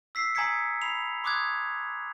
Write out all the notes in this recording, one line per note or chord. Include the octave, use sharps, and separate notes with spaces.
E6 B6 C7
G#5 A#5 D#6 G#6 B6 C#7
B5 C7 F7
C6 D6 D#6 F#6 G#6